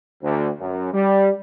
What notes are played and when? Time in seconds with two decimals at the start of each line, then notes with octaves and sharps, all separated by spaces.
0.22 D2
0.59 F#2
0.92 G3